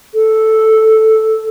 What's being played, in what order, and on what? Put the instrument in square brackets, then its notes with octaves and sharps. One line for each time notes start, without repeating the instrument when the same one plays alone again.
[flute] A4